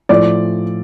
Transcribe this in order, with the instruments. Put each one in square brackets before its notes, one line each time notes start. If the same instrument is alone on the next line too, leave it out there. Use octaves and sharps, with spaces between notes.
[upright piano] A2 F3 D5